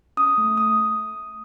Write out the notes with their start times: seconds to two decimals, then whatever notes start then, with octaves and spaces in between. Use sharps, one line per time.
0.17 C#4 D#6
0.38 A3
0.57 D#6